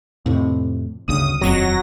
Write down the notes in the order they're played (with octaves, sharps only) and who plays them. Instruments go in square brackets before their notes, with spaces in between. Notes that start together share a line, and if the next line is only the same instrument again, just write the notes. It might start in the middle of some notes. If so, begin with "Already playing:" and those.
[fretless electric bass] F2 A2 C3
[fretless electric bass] G1 D2 C#3 [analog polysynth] D#6
[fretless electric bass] D#1 F2 [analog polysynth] F#3 A#6